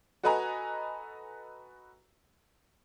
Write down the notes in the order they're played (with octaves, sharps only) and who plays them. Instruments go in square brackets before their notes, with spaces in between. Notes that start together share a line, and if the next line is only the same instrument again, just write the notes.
[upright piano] F#4 A4 B4 D#5 G#5 A#5